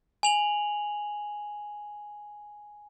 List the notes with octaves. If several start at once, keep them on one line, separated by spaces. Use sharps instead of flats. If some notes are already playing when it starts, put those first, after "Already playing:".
G#5 F7 F#7